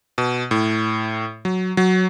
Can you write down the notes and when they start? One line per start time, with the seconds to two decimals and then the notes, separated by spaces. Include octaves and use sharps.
0.18 B2
0.51 A2
1.45 F#3
1.77 F#3